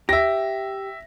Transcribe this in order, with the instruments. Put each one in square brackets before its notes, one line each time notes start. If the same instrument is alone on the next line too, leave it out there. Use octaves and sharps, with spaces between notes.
[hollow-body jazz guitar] G4 [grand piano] E5 A#6